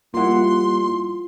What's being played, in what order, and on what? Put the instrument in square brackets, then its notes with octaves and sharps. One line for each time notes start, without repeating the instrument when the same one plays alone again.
[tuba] G3 [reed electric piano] A#3 E4 [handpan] F4 F#5 [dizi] C6